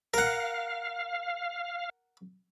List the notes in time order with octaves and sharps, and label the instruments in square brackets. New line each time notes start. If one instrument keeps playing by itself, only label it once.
[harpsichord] A#4 F#5 [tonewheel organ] F5